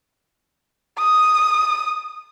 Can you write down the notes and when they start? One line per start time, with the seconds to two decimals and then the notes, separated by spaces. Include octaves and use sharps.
0.99 D#6